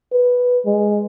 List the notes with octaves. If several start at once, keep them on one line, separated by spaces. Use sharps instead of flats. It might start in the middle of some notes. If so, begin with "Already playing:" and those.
B4
G#3